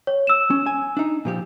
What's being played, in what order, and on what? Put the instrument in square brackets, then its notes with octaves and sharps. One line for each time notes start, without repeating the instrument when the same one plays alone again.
[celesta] C#5
E6 E7
[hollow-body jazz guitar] C#4
G#5
D4 D#4
A#2 F3 G4